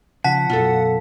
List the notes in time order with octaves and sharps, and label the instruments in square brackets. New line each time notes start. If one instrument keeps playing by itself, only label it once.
[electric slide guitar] C#3 F3 [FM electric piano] F#5 [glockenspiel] A5 B6
[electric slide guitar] F#2 B2 [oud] F4 A4